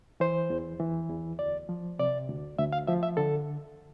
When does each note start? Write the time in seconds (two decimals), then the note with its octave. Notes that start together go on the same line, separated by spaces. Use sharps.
0.20 E3 C5
0.50 E2
0.80 E3
1.10 E2
1.39 D2 D5
1.69 F3
1.99 C3 D5
2.28 D2
2.59 D2 E5
2.73 F5
2.87 F3 E5
3.03 E5
3.17 D3 A4